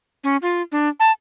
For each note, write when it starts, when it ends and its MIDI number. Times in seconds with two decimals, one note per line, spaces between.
0.24 0.37 61
0.42 0.62 65
0.72 0.89 62
1.00 1.12 81